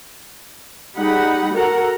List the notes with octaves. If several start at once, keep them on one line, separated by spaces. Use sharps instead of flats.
G3 D#4 G#4 F#5 B5
F#4 A4 A#4 F#5 A#5